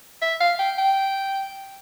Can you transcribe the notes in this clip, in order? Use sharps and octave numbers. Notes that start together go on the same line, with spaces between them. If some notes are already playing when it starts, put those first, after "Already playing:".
E5
F5
G5
G5